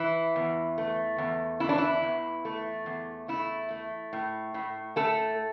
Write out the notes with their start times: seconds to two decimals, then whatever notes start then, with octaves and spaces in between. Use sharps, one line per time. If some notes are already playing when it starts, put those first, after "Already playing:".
Already playing: E3 E4
0.36 E2
0.78 A3
1.18 E2
1.60 E3 E4
1.69 D4
1.78 E4
2.03 E2
2.45 A3
2.86 E2
3.28 A3 E4
3.70 A3
4.13 A2
4.54 A2
4.96 A3 A4